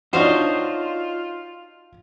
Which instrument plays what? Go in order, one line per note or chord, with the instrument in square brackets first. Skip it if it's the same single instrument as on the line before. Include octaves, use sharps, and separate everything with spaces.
[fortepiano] D4 F#4 [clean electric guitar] D#4 C#5 [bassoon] F4 [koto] C5 D#5 F5